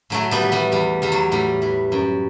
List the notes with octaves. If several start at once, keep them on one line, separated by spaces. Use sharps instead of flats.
A2 F#3 A3
G3 B3
E3
G3 B3
E2 G3
E2 G3
F#3
A2 G3
E3
F#2